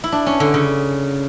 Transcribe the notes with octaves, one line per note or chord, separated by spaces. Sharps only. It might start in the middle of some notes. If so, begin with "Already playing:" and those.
E4
D4
C#4
D3
C#3